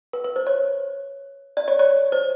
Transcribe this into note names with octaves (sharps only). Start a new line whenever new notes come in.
B4
B4
C5
C#5
D5
C#5
C#5
C5